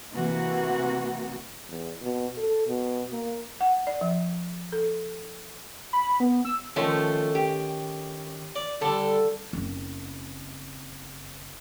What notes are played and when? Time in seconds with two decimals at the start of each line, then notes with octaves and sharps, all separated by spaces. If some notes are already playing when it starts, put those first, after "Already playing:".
0.12 C3 E3 A#3 F#4
1.69 E2
2.01 B2
2.37 A4
2.67 B2
3.12 A#3
3.61 F#5
3.87 D5
4.01 F3
4.72 A4
5.93 B5
6.20 B3
6.45 E6
6.76 D#3 F3 A3 C#4
7.35 G4
8.56 D5
8.81 D3 G3 A4
9.53 F#1 C4